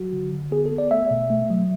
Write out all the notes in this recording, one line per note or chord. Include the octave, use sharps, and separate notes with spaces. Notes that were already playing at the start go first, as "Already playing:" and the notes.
Already playing: F#3 F#4
D3
D3
B3 G#4
A4
B3
D5
A3 E5
B2
A3
F#3